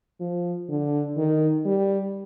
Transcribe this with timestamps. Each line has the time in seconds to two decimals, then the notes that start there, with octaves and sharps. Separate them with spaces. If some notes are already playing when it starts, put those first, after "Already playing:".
0.20 F3
0.69 D3
1.17 D#3
1.65 G3